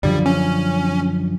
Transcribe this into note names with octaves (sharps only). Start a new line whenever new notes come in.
F#2 D3 F3 G3
C#4